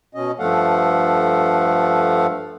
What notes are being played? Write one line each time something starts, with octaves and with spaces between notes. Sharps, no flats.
B2 C#4 D#5
G2 F3 A3 A4 F5 F#5